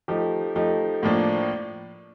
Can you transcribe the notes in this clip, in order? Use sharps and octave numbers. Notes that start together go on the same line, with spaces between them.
F3 A3 D#4 G4
F3 A3 D#4 G4
A2 F3 A#3 D4